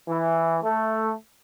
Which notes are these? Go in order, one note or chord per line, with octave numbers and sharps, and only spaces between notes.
E3
A3